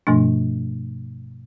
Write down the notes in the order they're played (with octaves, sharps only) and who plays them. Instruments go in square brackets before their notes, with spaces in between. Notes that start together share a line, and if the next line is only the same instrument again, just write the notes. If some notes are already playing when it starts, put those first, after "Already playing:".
[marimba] G2 B2 F3 A3 D4